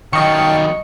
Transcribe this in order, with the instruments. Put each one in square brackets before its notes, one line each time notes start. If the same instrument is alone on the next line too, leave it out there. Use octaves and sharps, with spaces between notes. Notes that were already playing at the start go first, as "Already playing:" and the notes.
[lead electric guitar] D#3 F#3 [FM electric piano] D#5 C#7 [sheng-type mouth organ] F5 G5 A5 [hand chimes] C#6